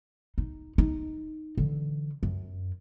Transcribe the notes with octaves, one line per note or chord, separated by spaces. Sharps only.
D#4
D#4
D3 E3
F#2